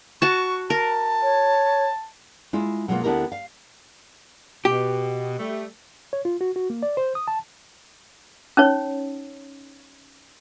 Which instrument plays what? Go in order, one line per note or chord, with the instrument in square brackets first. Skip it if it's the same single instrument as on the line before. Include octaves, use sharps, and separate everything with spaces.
[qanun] F#4 A5 [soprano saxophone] C#6
[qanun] A#4 [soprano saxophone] A5
[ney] C#5
[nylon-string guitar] G#3 E4 F4
B2 F#3 G#3 A#3 B3 F4
D2 B3 D4 E4 G4 A#4
F5
[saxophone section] B2 [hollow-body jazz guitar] G4
[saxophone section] G3 A3
[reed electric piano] C#5
F4
F#4
F#4
A#3
D5
C5
D#6
A5
[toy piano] C#4 D#4 C#5